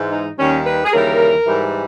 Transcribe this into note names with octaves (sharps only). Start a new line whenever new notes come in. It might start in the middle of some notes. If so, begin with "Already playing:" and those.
Already playing: G#2 E3 G#3
D#4
D#2 D#3 G3 C#4
B4
G#4
D#2 C#3 E3 G3 A#4
G#2 E3 G3